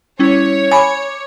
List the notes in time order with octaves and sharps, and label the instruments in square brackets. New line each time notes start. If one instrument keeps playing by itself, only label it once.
[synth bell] G3 C#4 E4 [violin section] C#5
[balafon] G#5 B5 [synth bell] C#6 D6